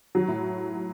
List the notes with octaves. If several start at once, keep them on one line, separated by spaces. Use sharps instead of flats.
F#3
A2